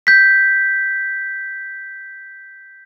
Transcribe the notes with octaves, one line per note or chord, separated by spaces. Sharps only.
G6 B6